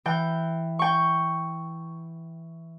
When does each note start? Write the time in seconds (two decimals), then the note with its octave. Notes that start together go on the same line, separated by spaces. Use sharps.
0.06 E3 G5
0.79 G5 C#6